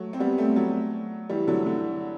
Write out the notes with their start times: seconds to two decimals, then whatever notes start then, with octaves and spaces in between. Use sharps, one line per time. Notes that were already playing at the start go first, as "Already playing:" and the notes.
Already playing: F#3 A3
0.13 C4
0.20 G3 B3
0.38 A3 C4
0.56 F#3 A3
1.30 E3 G3
1.47 D3 F#3
1.66 D3